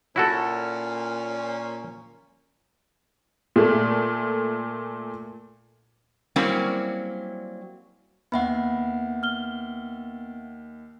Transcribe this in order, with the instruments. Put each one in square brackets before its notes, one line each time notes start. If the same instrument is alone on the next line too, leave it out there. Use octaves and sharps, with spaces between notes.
[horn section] A#2 C#4 [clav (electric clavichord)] E4 F#4 A4
[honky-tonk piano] A#2 A3
[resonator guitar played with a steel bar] F#3 G3 A#3 C4 C#4 E4
[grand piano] D#2 [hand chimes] B3 E5 F#5 [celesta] B5
[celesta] F6 G7